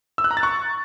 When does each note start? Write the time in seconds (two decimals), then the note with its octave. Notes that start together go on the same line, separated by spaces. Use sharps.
0.18 E6
0.24 F#6
0.31 A#5
0.37 A6
0.43 C#6